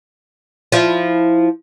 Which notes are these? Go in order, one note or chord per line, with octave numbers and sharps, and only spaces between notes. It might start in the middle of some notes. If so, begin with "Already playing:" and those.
F3 E4